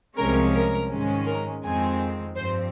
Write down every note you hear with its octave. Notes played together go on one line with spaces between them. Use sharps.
C2 C3 F3 G#3 C#4 A#4
A#4
G#2 D#3 G#3 C#4
A#4
F2 D#3 G#3 C4 G#5
G2 F3 C4 C5